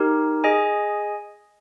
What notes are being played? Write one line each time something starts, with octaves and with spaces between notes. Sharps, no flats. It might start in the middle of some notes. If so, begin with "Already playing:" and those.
Already playing: D#4 G4 A#4
G#4 D#5 G#5